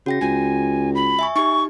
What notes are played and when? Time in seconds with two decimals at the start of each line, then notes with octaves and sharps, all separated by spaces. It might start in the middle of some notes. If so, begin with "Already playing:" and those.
0.06 C#3 F#4 G5 A#6
0.21 C#2 G#5
0.95 B5
1.19 E5 G#5 C#6
1.36 D#4 G4 C#6